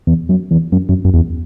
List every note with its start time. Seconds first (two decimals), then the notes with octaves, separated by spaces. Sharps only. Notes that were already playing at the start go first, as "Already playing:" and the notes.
0.07 E2
0.29 F#2
0.51 E2
0.72 F#2
0.89 F#2
1.05 F#2
1.14 E2